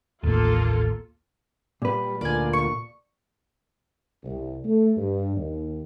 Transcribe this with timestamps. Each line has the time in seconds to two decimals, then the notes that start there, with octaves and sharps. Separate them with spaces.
0.23 A1 D#2 A#3 F4 A4
1.82 A#2 G3 B4
2.21 D2 A#3 F4 D5 G#5
2.53 C#6
4.24 C2
4.64 A3
4.97 G2
5.36 D#2